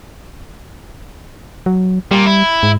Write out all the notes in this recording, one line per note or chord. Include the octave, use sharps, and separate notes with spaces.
F#3
A#2 G3
E4
G#2